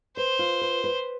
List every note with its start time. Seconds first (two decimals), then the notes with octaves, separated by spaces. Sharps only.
0.17 B4 C5
0.39 F4
0.61 B4
0.84 B4